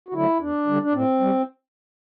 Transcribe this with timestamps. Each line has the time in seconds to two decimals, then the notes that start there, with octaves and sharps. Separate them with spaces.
0.09 F#4
0.14 D3 F#3 A3 E4
0.41 E2 D4
0.67 D3 G3
0.82 D4
0.93 A2 C4
1.20 G3